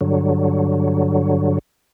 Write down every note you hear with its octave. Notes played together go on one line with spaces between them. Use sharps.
G2 D3 F#3